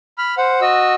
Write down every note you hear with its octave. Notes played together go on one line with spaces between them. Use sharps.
B5 F6
C5 F#5
F#4 D#5 E6